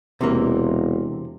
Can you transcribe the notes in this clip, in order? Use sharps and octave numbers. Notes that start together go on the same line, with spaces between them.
E1 C3 E3 A#3